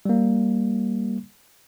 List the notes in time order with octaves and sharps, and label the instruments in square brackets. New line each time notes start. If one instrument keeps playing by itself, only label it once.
[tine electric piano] G3 A#3